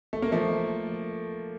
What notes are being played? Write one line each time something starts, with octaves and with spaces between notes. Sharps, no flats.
A3
A#3
F3 A3